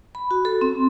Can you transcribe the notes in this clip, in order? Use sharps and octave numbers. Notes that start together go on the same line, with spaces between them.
B5
F#4
A4
C4